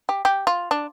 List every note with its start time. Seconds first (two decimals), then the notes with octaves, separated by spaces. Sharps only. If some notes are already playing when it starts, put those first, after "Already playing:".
0.09 G4
0.25 G4
0.47 F4
0.71 D4